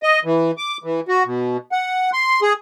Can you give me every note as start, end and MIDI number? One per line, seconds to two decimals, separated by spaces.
0.03 0.20 75
0.25 0.51 52
0.58 0.77 86
0.84 1.00 52
1.08 1.23 66
1.25 1.57 47
1.72 2.10 78
2.13 2.40 84
2.42 2.53 68